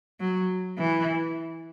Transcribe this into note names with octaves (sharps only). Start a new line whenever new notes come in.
F#3
E3